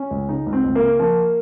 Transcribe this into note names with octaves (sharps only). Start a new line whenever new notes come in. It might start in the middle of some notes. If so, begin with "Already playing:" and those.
Already playing: C#4
C#2
C#3 D#4
C#2
C4
C#2
A#3
C#3
F3 A#3